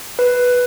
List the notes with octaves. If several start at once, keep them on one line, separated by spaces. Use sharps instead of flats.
B4